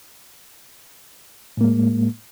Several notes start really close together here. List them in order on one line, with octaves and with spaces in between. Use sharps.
A2 A#3 G#3